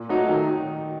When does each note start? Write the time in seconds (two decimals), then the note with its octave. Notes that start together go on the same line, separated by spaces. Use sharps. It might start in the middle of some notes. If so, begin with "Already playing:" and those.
Already playing: A#2
0.09 F#3 A3 D#4 F#4
0.29 D#3